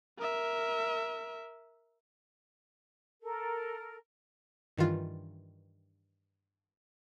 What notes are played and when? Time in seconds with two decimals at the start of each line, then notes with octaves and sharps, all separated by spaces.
0.19 A#4 E5
3.22 A4 A#4
4.77 G2 D#3 E3 F4